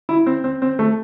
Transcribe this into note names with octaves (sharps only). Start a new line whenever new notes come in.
E4
C4
C4
C4
A3